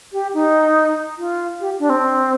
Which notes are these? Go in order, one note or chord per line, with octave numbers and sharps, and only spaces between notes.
G4
D#4
F4
G4
D4
C4